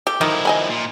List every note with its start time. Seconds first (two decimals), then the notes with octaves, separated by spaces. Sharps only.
0.07 G4 A4
0.21 D#3 F3 E4
0.45 D#5 G#5 B5
0.70 A#2